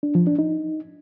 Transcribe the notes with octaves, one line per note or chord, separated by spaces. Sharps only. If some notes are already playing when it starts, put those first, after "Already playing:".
D4
F3
D4
D#4